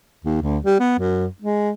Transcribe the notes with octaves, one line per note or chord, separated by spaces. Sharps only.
D#2
D2
G3
B3
F#2
G#3